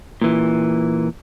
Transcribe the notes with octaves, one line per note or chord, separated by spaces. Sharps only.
A#2 E3